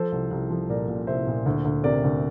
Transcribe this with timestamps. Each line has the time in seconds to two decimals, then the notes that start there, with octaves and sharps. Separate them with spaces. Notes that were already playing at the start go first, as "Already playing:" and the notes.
Already playing: F3 A4 C5
0.12 C2
0.31 C2
0.50 F3
0.69 A#2 A#4 D5
0.88 A#2
1.07 C2 C5 E5
1.27 A#2
1.46 D2
1.65 D2
1.83 C3 A#4 D5
2.04 D2